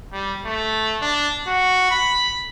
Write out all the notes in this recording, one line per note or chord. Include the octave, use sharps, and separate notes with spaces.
G3
A3
D4
F#4
B5